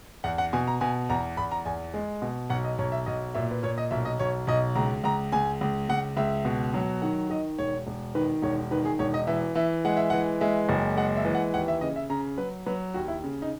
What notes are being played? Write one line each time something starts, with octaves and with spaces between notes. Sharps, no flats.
E2 F#5
F#5
B2 G#5
A#5
B2 G#5
E2 A#5
E2 B5
A#5
E2 G#5
G#3
B2
B1 F#5
D#5
B1 C#5
E5
B1 D#5
A#2 E5
B4
A#2 C#5
D#5
B1 E5
D#5
B1 C#5
B1 D#5
C#2 A#5
C#2 A#5
C#2 G#5
C#2
C#2 F#5
C#2 E5
B2
F#3
D#3 F#5
D#3 D#5
E1 C#5
E1
D#3 B4
E1 C#5
D#3 B4
G#4
E1 C#5
D#5
E3 E5
E3 E5
G#3 F#5
E5
E3 F#5
G#3 E5
F#1
G#3 F#5
E5
E3
F#5
D#2 F#5
E5
C#3 D#5
E5
C#3 A#5
F#3 B4
F#3 B4
D#2 F#4
E4
C#3
D#4